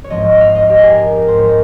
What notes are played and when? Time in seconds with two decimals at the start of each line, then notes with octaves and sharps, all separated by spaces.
0.04 C#5
0.10 G#2 F3 C4 D#5
0.41 F5
0.55 D#5
0.70 G4
0.79 G#4
0.89 A#4
1.27 G#2 F3 C4 C5
1.38 C#5
1.47 D#5